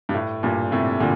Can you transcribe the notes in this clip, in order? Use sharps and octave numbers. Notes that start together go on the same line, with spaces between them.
G2
A2
G2 A#2
A2 C3
A#2 D3